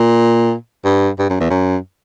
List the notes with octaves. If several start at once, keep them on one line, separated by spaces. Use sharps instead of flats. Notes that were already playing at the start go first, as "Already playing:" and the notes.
Already playing: A#2
G2
G2
F#2
E2
F#2